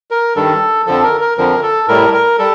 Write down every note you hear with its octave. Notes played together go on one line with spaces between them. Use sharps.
A#4
G2 D#3 G3 A4
F2 D3 F3 A4
A#4
A#4
F2 D3 F3 A#4
A4
A2 G3 A#4
A#4
G3 A4